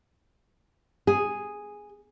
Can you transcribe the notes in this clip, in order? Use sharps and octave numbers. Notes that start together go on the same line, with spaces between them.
G#4